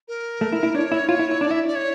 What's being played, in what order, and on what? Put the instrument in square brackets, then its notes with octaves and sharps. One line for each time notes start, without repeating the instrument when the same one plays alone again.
[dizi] A#4
[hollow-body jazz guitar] A3
E4
E4
[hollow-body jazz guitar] D4 [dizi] C#5
[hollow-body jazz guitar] E4
F4
E4
E4
[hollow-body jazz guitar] D4 [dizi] D5
[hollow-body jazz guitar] E4 [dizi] E5
[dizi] D5
C#5